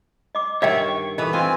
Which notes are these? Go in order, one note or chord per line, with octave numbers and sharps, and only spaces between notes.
D#5 D6
G2 D#3 C#5 D#5 E5 F#5 G5
C#6
E3 A4 B4 D#5
E3 C4 F4 G#5